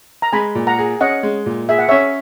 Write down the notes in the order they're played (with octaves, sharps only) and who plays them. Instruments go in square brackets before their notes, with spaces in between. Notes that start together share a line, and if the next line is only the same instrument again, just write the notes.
[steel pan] A#5
[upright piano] G#3 [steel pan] G#5 B5
[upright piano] A#2
[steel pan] F#5 A#5
[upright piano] G#4
[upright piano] C#4 [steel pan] D#5 F#5
[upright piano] G#3
A#2
[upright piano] G#4 [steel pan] E5
[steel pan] F#5
[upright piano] C#4 [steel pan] C#5 E5